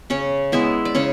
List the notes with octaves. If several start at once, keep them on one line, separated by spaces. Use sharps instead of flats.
C#3 C#4 C#5
G#3 B3 E4 E5
D5
C#3 C#4 C#5